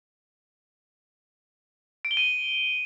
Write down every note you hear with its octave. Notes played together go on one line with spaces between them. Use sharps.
D7
G7
D#7